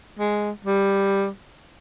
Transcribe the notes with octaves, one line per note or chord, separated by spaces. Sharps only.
G#3
G3